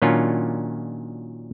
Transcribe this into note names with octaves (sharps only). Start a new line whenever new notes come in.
A#2 D#3 F#3 C#4 D4 F4